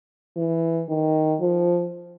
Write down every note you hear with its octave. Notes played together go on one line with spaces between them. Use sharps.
E3
D#3
F3